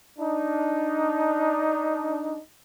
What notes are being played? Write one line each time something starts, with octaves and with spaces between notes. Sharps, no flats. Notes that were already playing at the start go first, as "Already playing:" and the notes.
D4 D#4